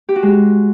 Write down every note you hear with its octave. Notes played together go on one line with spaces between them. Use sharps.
G4
F#4
G#3